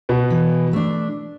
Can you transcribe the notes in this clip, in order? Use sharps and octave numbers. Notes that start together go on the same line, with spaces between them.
B2 B3
E3
A3 D4